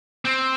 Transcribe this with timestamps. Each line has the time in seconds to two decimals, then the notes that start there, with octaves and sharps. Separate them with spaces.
0.25 C4